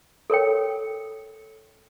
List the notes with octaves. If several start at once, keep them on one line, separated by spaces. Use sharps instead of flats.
A4 A#4 C#5 G5